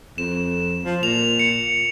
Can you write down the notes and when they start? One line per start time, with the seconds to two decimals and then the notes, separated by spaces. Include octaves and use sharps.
0.18 F2 E7
0.85 F3
1.03 A#2 F7
1.39 C#7